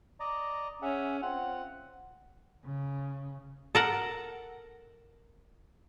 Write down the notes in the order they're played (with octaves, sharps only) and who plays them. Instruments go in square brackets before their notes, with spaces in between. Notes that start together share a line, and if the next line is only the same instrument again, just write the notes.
[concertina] D5 D#5 A#5
[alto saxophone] C#4 [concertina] G#4 E5 F#5
[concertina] C4 F4 [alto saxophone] F#5
[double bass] C#3
[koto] A4 A#4 F#5